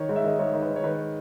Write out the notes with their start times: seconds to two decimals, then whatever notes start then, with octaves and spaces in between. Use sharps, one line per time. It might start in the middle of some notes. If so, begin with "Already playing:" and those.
Already playing: D#3 C#5
0.09 G#2
0.16 E5
0.24 D#3 D#5
0.39 G#2 C#5
0.53 D#3
0.62 B4
0.69 G#2
0.76 C#5
0.84 D#3 B4